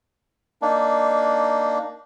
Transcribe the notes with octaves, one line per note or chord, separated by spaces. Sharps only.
A#3 D4 D#4